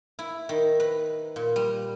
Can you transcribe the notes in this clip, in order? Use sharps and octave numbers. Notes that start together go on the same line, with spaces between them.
E4
D#3
B4
A#2
G3